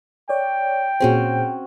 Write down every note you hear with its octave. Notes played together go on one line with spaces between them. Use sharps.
C#5 D5 G5
A#2 C4 C#4 F#4 G#4 C5